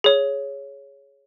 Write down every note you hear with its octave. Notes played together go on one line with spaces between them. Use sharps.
G#4 C#5